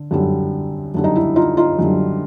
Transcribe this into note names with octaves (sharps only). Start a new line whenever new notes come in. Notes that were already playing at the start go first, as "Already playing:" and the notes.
Already playing: D3
F#2 D3 G3
F#2 D3 G3
D#4
E4
D#4 F4
D#4 F4
F#2 D3 G3